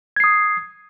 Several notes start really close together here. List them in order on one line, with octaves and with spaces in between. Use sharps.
G#6 C7 D#6